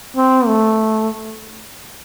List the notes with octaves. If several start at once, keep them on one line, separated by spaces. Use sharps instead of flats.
C4
A3